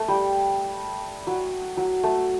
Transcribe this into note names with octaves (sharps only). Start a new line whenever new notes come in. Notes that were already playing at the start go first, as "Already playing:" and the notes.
Already playing: A3
G3
F#3
F#3
A3